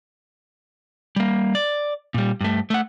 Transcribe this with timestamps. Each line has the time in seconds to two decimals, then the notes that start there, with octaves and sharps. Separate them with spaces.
1.16 G3 A#3
1.55 D5
2.14 A#2 G3
2.41 G2 A3
2.70 A3 F#5